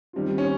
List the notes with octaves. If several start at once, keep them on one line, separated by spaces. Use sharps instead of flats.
D#3 G3 C4 F4
C#4